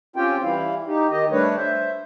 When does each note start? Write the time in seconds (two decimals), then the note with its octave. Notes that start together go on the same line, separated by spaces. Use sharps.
0.16 C4 C#4 F4 G4 G5
0.43 E3 G3 E4 F5
0.88 D#4 G4
1.11 D#3 G4 D#5
1.32 G3 A3 D4 B4 C#5
1.57 C5 E5